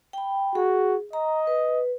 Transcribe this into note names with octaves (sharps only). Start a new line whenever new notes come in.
G5 B5
F#4 G#4
D#5 A#5
B4